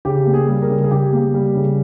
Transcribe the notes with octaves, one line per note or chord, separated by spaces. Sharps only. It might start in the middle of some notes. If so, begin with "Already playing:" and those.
C#3 G4
A#3
G#4
G3
A#4
C#3
G#4
C#3 G4
A#3
G3
C#3